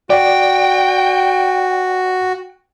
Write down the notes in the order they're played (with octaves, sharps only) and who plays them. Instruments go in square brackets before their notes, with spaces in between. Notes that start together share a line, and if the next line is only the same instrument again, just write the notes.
[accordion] F#4 [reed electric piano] D5 [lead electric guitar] G5